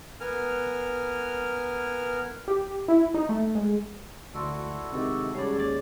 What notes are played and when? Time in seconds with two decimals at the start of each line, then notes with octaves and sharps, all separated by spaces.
0.20 B3 A#4 G#5 F6
2.48 G4
2.88 E4
3.14 D#4
3.29 A3
3.55 G#3
4.34 D2 E4 F#4 A4 D5 C6
4.92 C3 D#3 G#3 C#6 D6
5.35 G3 G#3 C#4 G#4 C#5 D5
5.58 D#2 D5 A6